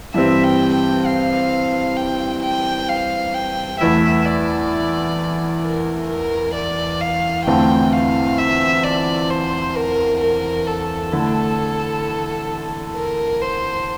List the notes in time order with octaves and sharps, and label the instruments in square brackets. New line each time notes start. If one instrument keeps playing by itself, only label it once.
[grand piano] G2 E3 G3 C4 [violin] E5
[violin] G5
G5
F5
G5
G5
F5
G5
[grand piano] E2 E3 A3 E4 [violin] E5
[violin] D5
A#4
A#4
D5
F5
[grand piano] E2 D3 A3 C4 F4 [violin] G5
[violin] F5
E5
D5
C5
A#4
A#4
A4
[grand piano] D3 A3 E4
[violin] A#4
C5